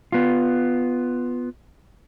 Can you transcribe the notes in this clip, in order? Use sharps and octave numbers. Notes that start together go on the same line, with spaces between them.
B3 F4